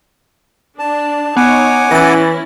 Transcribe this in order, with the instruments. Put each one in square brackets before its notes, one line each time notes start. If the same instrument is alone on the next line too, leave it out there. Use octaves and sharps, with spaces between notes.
[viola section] D4 [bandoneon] A5
[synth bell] B3 [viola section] D#4 C#5 [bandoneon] F#5 G#5 D6
[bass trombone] E3 [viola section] C#4 E4 [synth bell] A6 A#6